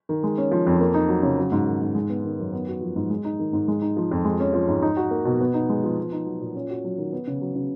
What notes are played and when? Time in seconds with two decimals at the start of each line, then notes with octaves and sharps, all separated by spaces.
0.09 D#3
0.23 G#3
0.38 C#4
0.52 F3
0.67 F2
0.80 A#3
0.94 D#4
1.09 F#3
1.23 C#3
1.38 F#3
1.52 G#2
1.67 D#3
1.82 G#2
1.95 G#3
2.09 B3
2.24 D#3
2.39 F#2
2.53 B3
2.67 F#4
2.81 F3
2.96 G#2
3.10 G#3
3.25 D#4
3.39 D#3
3.53 G#2
3.68 G#3
3.81 D#4
3.97 F3
4.11 F2
4.25 G#3
4.40 C#4
4.53 F3
4.68 G#2
4.82 D#4
4.97 F#4
5.11 A#3
5.25 B2
5.41 B3
5.54 D#4
5.69 G#3
5.84 F3
5.98 B3
6.12 D#4
6.26 F#3
6.41 A#2
6.55 C#4
6.70 F#4
6.84 F#3
6.98 D#3
7.13 B3
7.27 C#3
7.41 F#3
7.55 C#3